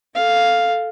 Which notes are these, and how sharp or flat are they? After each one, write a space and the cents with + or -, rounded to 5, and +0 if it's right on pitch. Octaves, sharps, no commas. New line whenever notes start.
A4 +0 F5 +0